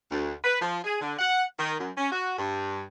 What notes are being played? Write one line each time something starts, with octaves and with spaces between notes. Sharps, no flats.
D2
B4
F3
G#4
D3
F#5
D#3
F#2
C#4
F#4
G2